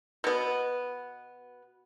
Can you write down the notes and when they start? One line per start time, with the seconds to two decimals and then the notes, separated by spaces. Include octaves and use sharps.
0.24 B2 B3